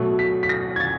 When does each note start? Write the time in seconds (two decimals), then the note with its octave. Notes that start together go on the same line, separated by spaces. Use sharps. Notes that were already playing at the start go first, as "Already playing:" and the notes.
Already playing: B2 F#3 A3
0.19 B6
0.43 B6
0.49 A#6
0.76 G#6
0.80 A6